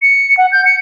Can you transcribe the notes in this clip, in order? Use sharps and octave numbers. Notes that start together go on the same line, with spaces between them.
C#7
F#5
G6
C#7